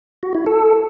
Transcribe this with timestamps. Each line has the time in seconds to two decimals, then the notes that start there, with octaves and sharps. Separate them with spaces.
0.23 F#4
0.35 E4
0.46 A4